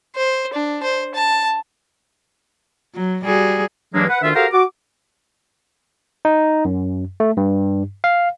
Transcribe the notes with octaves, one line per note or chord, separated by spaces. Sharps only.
C5
D4
C5
A5
F#3
G3 F#4 G#4
G2 E3 F#3 G#3 A#3 D4
B4 F#5
D2 D#3 D4 F4 E5
F#4 G4 A4 A#4 C5 F5
F#4 D6
D#4
F#2
A3
G2
F5